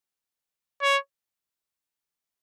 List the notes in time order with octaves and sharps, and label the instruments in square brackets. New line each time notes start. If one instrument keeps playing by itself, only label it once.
[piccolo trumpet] C#5